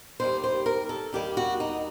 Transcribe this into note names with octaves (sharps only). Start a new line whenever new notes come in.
D#2 D#3 G3 C5
C5
A#4
A4
D#2 D#3 G3 G4
F#4
D#4